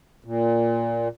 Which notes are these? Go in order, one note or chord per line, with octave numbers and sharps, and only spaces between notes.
A#2